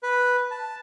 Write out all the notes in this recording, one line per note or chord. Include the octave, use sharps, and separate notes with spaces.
B4
A5